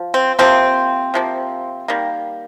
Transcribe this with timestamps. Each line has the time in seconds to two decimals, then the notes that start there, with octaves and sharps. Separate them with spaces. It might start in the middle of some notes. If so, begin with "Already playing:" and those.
Already playing: F3
0.14 C4
0.39 C3 F3 A#3 C4
1.14 C3 F3 A#3
1.88 D#3 G3 A#3